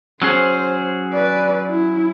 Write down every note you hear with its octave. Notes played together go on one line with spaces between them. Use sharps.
F#3 C#4 G#4 C5
B4 D5
E4